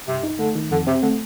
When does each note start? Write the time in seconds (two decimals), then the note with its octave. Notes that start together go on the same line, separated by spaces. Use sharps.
0.08 G2 C3
0.23 D#4
0.39 D3 A3
0.55 D#3
0.71 F2 D3
0.87 C3 C4
1.02 D3 A3